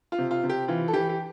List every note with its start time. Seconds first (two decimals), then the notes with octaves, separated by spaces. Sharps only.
0.12 F4
0.18 C3
0.31 F4
0.43 C3
0.49 G4
0.68 E3 F4
0.88 A4
0.93 E3 G4
1.09 G4